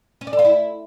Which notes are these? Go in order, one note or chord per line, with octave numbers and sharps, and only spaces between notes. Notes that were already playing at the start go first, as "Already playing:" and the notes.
C#4
D5
A4
F4
E4